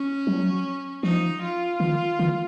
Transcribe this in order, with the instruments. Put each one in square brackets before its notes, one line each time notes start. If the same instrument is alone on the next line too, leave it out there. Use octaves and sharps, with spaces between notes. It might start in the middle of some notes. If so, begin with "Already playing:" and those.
Already playing: [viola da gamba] C#4
[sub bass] F#3
[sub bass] F3 [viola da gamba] D#4
[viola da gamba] F4
[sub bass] D#3
D#3